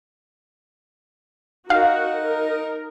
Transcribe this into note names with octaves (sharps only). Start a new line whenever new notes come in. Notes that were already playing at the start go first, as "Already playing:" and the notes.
D#4 F#4 A#4 F5
A#4